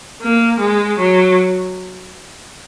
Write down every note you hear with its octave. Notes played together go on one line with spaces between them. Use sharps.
A#3
G#3
F#3